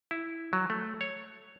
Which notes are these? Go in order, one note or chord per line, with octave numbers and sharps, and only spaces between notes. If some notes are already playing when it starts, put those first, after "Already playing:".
E4
F#3
A3
C#5